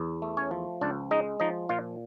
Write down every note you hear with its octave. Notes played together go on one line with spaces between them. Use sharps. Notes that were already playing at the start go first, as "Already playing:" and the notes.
Already playing: E2
A3
C#4 C#5
F3
C#2 D4 D5
G#3 D#4 D#5
F3 D#4 D#5
A#2 F4 F5